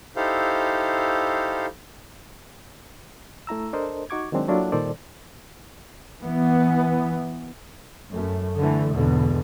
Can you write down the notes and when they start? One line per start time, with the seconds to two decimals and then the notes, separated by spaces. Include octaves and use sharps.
0.16 D#4 E4 G4 A4 C5 F5
3.47 A3 E4 A#5 E6
3.73 D4 A4 A#4 C5 D#5
4.10 D#4 F#4 C#6 D6 G#6
4.32 D#3 F#3 G#3 C4 D4
4.48 F#3 A#3 D4 E4 F4 A4
4.72 A#2 D#3 G3 A4 C5 D5
6.21 E3 B3
8.11 F#2 A3
8.59 D3 E3 A3
8.93 G#1 E2 B2 D3